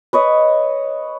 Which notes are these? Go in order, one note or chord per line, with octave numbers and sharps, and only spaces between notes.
B4 C#5 D#5